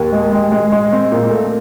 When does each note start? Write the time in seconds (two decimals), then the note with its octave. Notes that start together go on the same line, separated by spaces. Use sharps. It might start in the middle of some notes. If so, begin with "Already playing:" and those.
Already playing: D#2
0.12 G#3
0.32 G#3
0.52 G#3
0.72 G#3
0.92 C4
1.12 A#2
1.31 A3